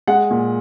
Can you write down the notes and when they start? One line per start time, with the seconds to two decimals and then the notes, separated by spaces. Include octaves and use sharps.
0.08 G#3 F#5
0.31 A#2